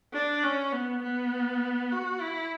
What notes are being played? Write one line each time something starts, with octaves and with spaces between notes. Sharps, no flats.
D4
C#4
B3
B3
F#4
E4